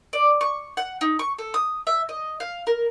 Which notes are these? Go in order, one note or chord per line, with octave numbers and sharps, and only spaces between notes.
D5
C#6
F#5
D#4
C#6
A4
D#6
E5
D#5
F5
A#4